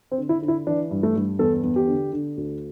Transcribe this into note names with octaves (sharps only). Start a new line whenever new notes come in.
C4
D3
E4
D3
E4
E3 D4
G2
A3
G2
E2 A4
E2
G4
D3
D3
D2